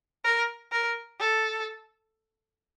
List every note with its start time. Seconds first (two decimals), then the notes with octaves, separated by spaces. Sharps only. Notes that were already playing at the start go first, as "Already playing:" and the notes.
0.24 A#4
0.72 A#4
1.20 A4